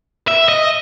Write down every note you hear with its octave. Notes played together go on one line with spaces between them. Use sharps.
E5
D#5